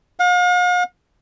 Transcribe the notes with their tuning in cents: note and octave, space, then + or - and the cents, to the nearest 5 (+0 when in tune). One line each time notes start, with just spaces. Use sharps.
F5 +45